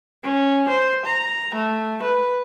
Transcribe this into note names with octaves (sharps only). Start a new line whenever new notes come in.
C#4
C5
A#5
A3
B4